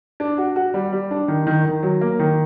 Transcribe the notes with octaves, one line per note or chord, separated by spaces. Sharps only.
D4
F#4
F#4
G3
G3
D4
D#3
D#3
D#3
F#3
A#3
D#3